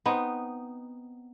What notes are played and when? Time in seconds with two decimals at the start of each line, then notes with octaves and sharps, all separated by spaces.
0.06 B3 C4 D#4